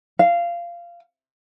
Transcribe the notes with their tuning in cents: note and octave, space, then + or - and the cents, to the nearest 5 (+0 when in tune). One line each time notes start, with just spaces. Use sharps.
F5 -15